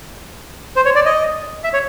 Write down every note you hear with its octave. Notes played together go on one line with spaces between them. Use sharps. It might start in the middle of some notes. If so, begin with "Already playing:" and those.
C5
C#5
D5
D#5
E5
C#5